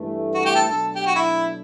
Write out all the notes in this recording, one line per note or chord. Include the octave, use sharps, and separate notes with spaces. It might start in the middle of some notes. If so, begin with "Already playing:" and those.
Already playing: G2 E3 A3
F#4
G4
A4
B2 F#3 A3 D4 A4
G4
F#4
E4